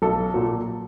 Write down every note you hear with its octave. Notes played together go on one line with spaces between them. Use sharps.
B1 A4
A#2 F#3